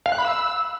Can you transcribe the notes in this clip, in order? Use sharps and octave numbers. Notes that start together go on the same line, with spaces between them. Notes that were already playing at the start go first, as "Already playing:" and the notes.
F5
F#6
B5
E6